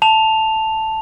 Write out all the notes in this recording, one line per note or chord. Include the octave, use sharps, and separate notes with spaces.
A5 F7